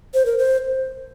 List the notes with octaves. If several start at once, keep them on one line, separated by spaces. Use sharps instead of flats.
C5
A#4
C5